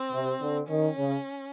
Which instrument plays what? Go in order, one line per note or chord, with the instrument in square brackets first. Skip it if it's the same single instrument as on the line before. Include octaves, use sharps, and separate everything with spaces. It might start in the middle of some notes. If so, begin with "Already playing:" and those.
Already playing: [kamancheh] C4
[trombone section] C3
D3
[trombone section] D#3 [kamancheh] C#4
[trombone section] C#3